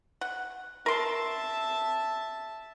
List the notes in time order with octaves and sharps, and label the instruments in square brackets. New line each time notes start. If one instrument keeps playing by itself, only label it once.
[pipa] F#5
[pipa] A#4 C6 [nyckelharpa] E5 A5